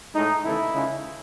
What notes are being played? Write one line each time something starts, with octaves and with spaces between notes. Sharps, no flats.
A2 G#3 D#4
D#2 C#3 E3 A3 E4
C#2 C#3 G#3